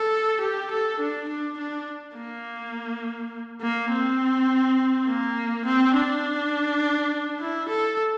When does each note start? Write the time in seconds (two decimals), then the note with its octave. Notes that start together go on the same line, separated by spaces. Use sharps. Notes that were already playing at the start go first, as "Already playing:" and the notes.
Already playing: A4
0.41 G4
0.71 A4
1.00 D4
1.28 D4
1.58 D4
2.16 A#3
3.61 A#3
3.90 C4
5.07 A#3
5.66 C4
5.94 D4
7.39 E4
7.69 A4